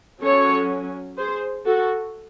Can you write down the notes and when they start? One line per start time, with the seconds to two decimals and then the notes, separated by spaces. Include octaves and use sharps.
0.22 F#3 C#4 A4 C#5
1.17 G#4 C5
1.66 F#4 A4